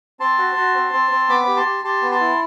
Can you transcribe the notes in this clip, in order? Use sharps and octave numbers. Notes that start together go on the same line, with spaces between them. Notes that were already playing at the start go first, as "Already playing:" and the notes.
C4 A5 C6
F#4
F#4
C4
C4
C4
B3 B5 D6
G4 B5
A5 C6
G4
G4 A5 C6
B3
A5 C6
E4